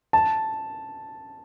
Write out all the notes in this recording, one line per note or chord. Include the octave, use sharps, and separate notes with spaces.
A5